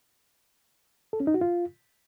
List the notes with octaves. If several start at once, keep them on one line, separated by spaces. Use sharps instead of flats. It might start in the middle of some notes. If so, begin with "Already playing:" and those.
A4
C#4
D#4
F#4
F4